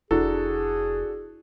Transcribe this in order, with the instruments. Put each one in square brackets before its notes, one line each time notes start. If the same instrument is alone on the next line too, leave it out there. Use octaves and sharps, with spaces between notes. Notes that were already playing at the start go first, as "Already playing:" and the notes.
[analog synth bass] F1 [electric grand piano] D4 F#4 A4 [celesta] E4 [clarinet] G#4